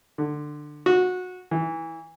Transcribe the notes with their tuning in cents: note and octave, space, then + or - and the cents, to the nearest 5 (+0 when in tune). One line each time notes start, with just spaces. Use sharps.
D3 +15
F#4 -20
E3 -10